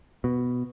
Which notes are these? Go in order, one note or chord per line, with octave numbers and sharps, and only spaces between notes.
B2